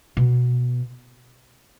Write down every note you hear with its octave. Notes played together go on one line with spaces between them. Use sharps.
B2